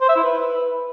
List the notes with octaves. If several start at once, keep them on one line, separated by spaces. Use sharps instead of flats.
C5
E5
E4
B4